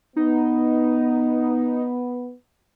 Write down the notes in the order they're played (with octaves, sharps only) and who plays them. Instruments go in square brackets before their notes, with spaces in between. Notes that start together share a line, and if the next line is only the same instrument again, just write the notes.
[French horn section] B3 [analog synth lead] D#4